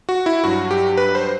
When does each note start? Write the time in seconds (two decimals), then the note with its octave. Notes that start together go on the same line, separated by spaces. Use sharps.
0.09 F#4
0.26 E4
0.44 G2 F#3 F#4
0.71 G4
0.97 B4
1.15 C5